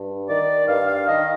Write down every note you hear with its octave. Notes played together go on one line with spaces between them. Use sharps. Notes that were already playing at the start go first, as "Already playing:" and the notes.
Already playing: G2
D#3 D5
G2 F5
F5
D#3 D#5